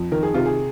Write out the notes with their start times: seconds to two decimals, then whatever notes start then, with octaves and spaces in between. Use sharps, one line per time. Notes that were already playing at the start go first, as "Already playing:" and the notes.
Already playing: F2
0.12 D#3 A#4
0.23 G#4
0.34 C3 F4
0.45 G#4